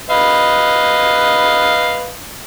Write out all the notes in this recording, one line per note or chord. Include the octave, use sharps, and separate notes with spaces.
B4 D#5 F5